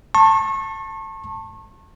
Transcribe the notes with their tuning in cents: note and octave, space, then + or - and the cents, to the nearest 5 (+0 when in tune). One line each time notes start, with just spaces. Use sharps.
A5 +20 C#6 -35